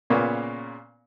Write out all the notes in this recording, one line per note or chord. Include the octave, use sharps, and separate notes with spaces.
A#2 C#3 A#3 B3 C#4